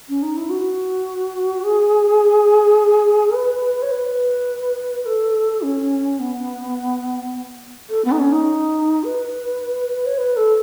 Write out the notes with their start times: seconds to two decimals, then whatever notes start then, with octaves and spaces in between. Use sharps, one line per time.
0.09 C#4
0.22 D#4
0.37 E4
0.50 F#4
1.63 G#4
3.34 B4
3.82 C#5
3.91 B4
5.06 A4
5.62 C#4
6.20 B3
7.90 A4
8.05 B3
8.12 D#4
8.19 C#4
8.32 D#4
9.04 B4
10.06 C#5
10.18 B4
10.37 A4